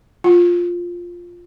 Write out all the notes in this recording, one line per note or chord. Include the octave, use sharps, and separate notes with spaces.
F4